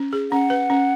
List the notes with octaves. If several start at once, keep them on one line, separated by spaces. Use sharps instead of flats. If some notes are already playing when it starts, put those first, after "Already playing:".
Already playing: C#4
G#4
C#4 F#5
B4
C#4